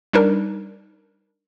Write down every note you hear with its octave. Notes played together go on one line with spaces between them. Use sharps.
G3 D4 D#4 A#4